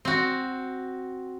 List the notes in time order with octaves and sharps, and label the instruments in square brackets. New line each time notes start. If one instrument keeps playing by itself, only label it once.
[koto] C4 F#4